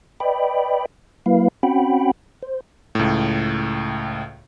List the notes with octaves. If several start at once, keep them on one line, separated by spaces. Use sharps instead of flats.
B4 D5 D#5 G5 B5
F#3 A#3 E4 B4 F5
C4 C#4 F#4 F#5 G5 B5
C5
C#2 A2